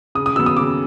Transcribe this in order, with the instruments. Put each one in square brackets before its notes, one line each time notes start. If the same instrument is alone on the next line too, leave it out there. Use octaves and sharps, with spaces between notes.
[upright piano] C#3 D#6
D#6
F#3 B3 E6
D#6
C#3 D6